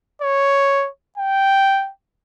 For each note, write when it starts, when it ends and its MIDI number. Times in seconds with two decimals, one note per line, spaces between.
0.22 0.89 73
1.18 1.90 79